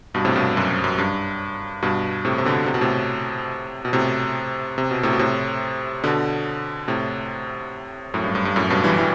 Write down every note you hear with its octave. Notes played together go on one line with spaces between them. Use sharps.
G2 B2
A2 C3
G2 B2
F#2
F#2
G2
G2 B2
A2 C3
C3
B2 D3
C3
B2
A2 C3
B2
A2 C3
C3
B2
A2 C3
B2
A2 C3
B2 D3
A2 C3
F#2 A2
G2
G2
G2
F#2 A2
G2 B2
E3 G3
E3 G3